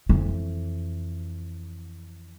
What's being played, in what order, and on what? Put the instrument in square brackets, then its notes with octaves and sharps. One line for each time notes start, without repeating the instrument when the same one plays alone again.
[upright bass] F2 E3